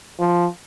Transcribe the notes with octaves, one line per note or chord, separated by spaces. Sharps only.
F3